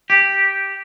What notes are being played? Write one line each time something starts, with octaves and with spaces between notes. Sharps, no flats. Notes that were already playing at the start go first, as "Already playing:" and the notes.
G4